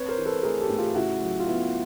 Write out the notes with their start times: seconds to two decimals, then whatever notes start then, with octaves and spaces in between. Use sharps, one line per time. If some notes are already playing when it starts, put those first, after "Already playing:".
Already playing: C4 B4 C#5
0.08 A#4 C5
0.18 E3
0.26 A4 B4
0.43 A3 G#4 A#4
0.61 G4 A4
0.69 A2
0.77 F4 G4
0.95 C#3 E4 F#4
1.21 F#3
1.40 F4
1.47 B3 E4